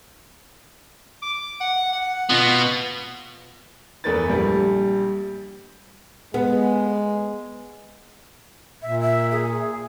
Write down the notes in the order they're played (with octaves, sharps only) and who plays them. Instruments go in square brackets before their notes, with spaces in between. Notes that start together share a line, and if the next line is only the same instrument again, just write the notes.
[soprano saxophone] D6
F#5
F#5
[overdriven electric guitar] B2 B3 [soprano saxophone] F4
[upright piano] E2 A3 A#4 B4 A6
A#1 G3
[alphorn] G#3 [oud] B3
[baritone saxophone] A#2 [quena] E5
[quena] E5
G#4